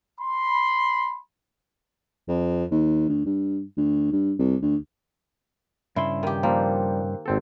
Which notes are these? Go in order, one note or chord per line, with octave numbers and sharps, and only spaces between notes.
B5 C6
F2
D#2
D2
G2
D2
G2
C2
D2
G2 C#3 E4 C6
D#3 G4
F3 G3 A#3 A#4 C5 G5
G#1 C4 A4